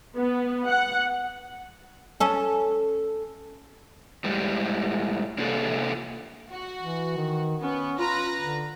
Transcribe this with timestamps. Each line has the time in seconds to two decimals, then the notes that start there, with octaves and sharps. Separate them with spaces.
0.16 B3
0.68 F#5
2.20 C#4 A4
4.24 A2 G3 G#3
5.38 C3 A#3 D4 F4 G#4 A4
6.51 F#4
6.79 E3
7.17 D#3
7.62 B3 C#4
7.99 F4 B4 A#5 A#6
8.40 D3